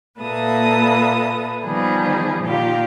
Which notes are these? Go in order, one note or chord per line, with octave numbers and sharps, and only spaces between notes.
A#2 A#3 A4 B4 E5 D#6
D#3 F3 G3 B3 G#4
A#2 D#3 F4 G4 F5